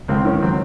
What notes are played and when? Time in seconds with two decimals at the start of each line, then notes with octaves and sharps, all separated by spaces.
0.08 C#2 C4
0.25 D#3 C#4
0.43 F#3 C4